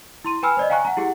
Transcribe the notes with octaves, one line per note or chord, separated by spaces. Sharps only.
E4 C6 D#7
B4 G5 G#5 B5 E6 F6
C5 D5 D#5
F5 G5 G#5 A#5 C#6 F#6
F#5 A#5
E4 G4 G#4 F#5